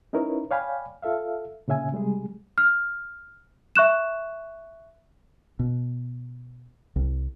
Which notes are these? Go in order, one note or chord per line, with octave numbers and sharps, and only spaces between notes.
C#4 D#4 E4 A#4 B4 C#5
C#5 D5 F5 G5 G#5 B5
F4 A4 E5 F5
A#2 C#3 C#4 E5 G#5
C3 G3 G#3 G#4
F6
E5 C#6 F#6 E7
B2
C2